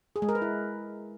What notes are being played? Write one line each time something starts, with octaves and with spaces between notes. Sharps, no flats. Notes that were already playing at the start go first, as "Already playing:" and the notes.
G#4
G#3
A#4
B4
E4